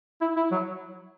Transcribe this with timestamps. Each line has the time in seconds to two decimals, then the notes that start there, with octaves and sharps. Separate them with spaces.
0.21 E4
0.36 E4
0.52 F#3